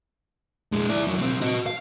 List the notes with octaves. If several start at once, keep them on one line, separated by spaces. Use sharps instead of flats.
F2 G#3
E4 D5
F2 F#3
B1 C4
F#4 D#5
F5